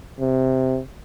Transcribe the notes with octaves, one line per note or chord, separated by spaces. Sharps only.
C3